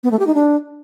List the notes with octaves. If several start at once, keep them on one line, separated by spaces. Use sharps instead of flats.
B3
A3
G4
D#4
D4